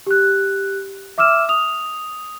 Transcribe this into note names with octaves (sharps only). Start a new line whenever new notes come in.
G4 F#6
E5 D6 E6 F6 E7
D#6 F7